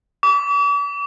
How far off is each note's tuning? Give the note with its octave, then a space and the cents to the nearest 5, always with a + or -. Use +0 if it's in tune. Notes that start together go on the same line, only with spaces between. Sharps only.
D6 -45